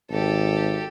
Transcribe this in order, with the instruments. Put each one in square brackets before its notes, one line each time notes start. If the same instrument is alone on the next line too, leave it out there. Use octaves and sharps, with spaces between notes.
[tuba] G#1 [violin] G4 A4